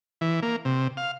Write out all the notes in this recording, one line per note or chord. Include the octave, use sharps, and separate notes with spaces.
E3
A#3
C3
F5